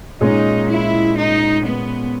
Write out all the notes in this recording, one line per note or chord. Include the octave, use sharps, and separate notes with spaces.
A#2 G#3 C#4 D#4 G#4
E4
D#4
B3